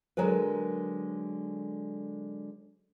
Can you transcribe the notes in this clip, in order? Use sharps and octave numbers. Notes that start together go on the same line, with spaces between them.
D3 F#3 G#3 A#4 B4